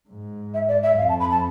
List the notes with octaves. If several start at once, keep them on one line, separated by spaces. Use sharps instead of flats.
G#2
E5
D5
E5
F2 F5
A5
B5
A5